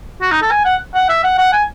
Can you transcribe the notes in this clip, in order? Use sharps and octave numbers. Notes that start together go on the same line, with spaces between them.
F#4
D#4
A4
G#5
F#5
F#5
E5
F#5
F#5
G#5